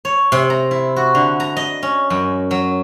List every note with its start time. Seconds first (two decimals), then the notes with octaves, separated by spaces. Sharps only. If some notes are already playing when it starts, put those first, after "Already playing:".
0.05 C#5
0.32 C3
0.50 A#5
0.71 E4
0.96 F#4
1.15 D3
1.40 A#5
1.57 D#5
1.83 C#4
2.10 F#2
2.51 F#3